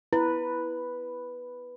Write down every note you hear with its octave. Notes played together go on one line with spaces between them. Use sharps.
E4 B4